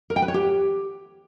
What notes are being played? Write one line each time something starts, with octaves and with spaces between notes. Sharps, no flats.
A#4
G5
B4
C#5
G4